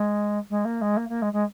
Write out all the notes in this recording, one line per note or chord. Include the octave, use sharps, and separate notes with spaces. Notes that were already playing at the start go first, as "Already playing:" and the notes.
Already playing: G#3
G#3
A#3
G#3
A#3
A#3
G#3
G#3